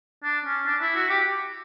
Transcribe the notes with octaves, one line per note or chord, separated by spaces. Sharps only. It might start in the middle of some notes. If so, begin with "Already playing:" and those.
D4
C#4
D4
E4
F#4
G4